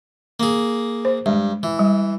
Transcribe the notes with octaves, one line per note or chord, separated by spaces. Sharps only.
A#3 G#4
C5
G2 G#3
E3
G3